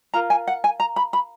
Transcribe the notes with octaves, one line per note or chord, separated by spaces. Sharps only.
F4 A#4 A#5
G#5
F#5
G#5
A#5
B5
B5